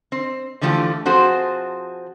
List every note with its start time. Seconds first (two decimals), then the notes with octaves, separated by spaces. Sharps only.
0.12 C4
0.61 D3 E3 F3 A3 F4 G4
1.05 F3 C4 F#4 G#4 A4 C5